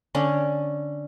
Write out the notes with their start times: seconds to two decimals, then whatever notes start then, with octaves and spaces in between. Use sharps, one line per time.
0.15 D3 C#4